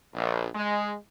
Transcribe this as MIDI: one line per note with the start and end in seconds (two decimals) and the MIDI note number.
0.14 0.45 34
0.54 0.95 56